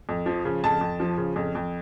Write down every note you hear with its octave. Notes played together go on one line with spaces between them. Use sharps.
F2
F3
C#3
F2 A5
F2
F3
C#3
F2
F2